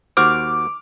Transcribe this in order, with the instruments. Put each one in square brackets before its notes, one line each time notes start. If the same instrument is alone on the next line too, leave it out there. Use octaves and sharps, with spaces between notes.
[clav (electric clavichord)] D#2 F#4 C5 [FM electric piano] D6 [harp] F6